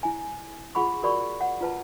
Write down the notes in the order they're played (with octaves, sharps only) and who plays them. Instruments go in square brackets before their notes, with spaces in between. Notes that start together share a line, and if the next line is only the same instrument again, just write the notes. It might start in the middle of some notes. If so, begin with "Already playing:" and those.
[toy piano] E4 G#5
F4 G#4 F#5 B5 C#6
F#4 G#4 A#4 D5 B5 C#6
F#5
F4 B4 A5